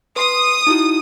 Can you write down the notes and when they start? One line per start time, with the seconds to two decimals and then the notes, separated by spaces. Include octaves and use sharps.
0.16 B4 C6 D#6 C7
0.67 D#4 E4 F#4